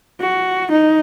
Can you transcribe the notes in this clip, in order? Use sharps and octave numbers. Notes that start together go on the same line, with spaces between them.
F#4
D#4